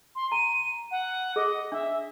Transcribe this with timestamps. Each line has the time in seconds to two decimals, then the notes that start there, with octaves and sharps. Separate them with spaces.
0.16 C6
0.32 A#5 D#7
0.91 F#5
1.36 G#4 D#5
1.72 D4 E5